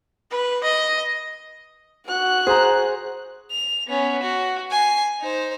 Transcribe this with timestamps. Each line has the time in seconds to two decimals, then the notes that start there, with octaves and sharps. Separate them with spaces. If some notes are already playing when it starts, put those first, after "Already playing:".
0.31 B4
0.64 D#5
2.06 F#4 F#6
2.47 G#4 C5 A#5
3.51 F7
3.87 B3 C#4
4.23 F#4
4.70 G#5 C7
5.20 D#4 C5